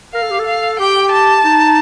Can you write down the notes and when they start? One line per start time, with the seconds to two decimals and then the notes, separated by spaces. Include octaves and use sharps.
0.14 A#4 F5
0.22 A4
0.31 G4
0.39 A4
0.46 F5
0.79 G4 G5
1.11 A5
1.44 D#4